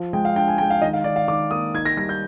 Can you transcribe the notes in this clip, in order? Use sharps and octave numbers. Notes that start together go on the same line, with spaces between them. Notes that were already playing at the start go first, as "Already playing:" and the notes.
Already playing: F3
G#3 G5
F5
D4 G5
G#5
G#3 G5
F5
D#3 D#5
F5
D#3 D5
F5
D#3 D6
A#3 D#6
D#4 G#6
A#6
G3 A#6
G6